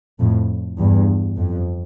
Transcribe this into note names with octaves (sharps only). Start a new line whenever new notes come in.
F2 A2
E2 G2
F2